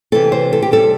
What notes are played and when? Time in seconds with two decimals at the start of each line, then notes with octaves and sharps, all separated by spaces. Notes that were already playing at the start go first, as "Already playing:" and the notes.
0.12 C3 E3 C4 A4
0.32 C5
0.53 A4
0.62 G4
0.71 C3 G3 C4 A4